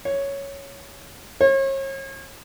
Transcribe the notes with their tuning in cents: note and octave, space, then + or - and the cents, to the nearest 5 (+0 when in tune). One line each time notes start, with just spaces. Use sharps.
C#5 +0
C#5 -40